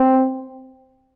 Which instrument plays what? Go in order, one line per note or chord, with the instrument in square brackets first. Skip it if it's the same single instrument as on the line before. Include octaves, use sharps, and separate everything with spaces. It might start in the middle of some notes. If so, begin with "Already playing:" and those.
Already playing: [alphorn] C4